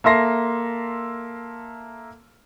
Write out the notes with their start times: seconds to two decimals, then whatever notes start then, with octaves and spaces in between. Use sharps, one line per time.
0.04 A#3 A4 E5 C6 A#6 C7